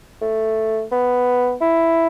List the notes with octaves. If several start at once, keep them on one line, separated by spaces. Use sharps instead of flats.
A3
B3
E4